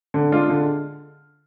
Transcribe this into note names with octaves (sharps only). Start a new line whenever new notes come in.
D3
G#3 D4 F4
D3